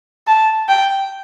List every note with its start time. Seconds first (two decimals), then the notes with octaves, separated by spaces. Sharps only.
0.27 A5
0.69 G5